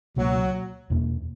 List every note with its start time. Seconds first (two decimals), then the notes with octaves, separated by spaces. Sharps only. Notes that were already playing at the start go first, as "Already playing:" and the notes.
0.16 C#2 B2 F#3 A#3
0.90 E2 B2 A#3